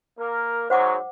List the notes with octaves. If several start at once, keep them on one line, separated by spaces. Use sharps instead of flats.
A#3 A#4
G#2 F#3 C5 F#5 D6